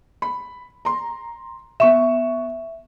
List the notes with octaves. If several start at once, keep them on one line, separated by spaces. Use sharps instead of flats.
B5
A#5 C6
B3 E5 C#6 E7